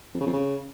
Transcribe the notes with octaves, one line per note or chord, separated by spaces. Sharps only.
F2
C#3
F2
C#3